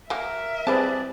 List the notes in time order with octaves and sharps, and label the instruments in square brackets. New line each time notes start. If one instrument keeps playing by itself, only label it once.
[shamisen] F#3 A#3 [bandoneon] A#4 [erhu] E5
[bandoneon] G3 D5 [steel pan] C4 G#4 B4 [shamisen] E4 A5